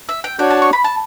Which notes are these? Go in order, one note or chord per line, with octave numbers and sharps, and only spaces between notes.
E5
G5
D4 F#4 C#5 G5
A5
C#6
B5
A5